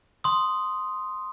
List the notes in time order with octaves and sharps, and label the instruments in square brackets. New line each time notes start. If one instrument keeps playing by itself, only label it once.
[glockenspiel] C6 D#6